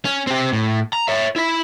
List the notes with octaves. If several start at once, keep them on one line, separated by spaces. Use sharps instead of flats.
C#4
C4 G4
A2
A#5
C#5 E5
E4 B5